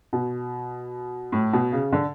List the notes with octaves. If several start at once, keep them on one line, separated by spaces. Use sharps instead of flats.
B2
A2
B2
C#3
D3